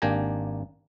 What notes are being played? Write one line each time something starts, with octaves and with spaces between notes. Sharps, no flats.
G#1 A#3 D4 G4 G#5 A#5